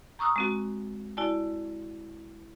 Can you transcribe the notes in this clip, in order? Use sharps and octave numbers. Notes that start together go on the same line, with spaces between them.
A#5 C#6 D#6 E6 F#6
G#3 C4 F#4
E4 F#4 D5 G#5 A5